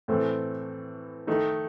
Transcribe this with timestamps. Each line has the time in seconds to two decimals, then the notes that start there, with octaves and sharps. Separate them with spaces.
0.08 A2 E3 A3 C4
1.27 D#3 A3 D#4